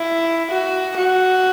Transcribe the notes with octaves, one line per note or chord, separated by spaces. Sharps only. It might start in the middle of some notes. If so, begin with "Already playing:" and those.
Already playing: E4
F#4
F#4